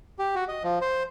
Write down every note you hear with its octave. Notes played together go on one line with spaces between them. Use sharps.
G4
F#4
D#5
F3
C5